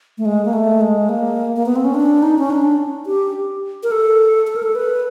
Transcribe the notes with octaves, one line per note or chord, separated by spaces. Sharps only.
A3
G#3
A#3
A3
G#3
A#3
A#3
B3
C4
C#4
D4
D#4
C#4
D4
G4
A#4
A4
A4
A#4
A4
B4